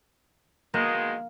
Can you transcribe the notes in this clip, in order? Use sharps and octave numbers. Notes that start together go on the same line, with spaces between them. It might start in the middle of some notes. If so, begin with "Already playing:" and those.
B2 D#3 G#3 A#3